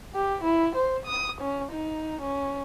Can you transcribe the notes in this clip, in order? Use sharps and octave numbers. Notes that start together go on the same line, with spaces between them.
G4
E4
C5
D#6
C#4
D#4
C#4